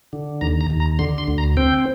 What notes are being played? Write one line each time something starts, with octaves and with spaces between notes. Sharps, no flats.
D3
D#2 A#5
A#5
D#2
A#5
D3 C6
C6
D2
A#5
C4 G5